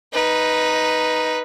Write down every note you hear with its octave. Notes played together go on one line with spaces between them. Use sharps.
D#4 B4